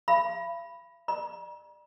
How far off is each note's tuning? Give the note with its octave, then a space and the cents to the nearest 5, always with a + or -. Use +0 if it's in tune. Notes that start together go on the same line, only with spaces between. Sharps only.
F5 -45 B5 +0
D5 +35 A#5 +45